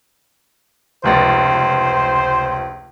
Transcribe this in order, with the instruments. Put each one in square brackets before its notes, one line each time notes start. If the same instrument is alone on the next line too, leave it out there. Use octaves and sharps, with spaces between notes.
[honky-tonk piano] F1 C#2 A6 [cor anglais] C5